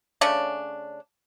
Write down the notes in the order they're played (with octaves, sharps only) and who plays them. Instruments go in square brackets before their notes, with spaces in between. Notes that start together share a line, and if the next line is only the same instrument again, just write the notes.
[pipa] C#3 A3 C#4 D4